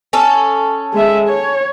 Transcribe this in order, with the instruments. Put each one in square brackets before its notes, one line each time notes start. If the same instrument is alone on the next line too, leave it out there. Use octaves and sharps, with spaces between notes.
[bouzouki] C#4 A4
[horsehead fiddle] G#3 E5
C#5